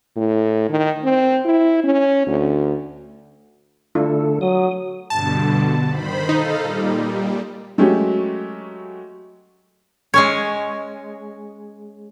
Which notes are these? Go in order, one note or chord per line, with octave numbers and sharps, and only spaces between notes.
A2
D#3
C4
E4
C#4
D2
D3 A3 D4 E4 F4 A4
F#3 D#6
G2 B2 D3 A5
D#3 C5 B5
D#4 A4 D#5 F5
A#2 G3
F#3 G#3 A3 C#4 G4
G#3 C#4 C#5